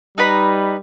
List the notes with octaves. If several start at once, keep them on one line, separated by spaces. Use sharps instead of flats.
G3 D#4 B4 B5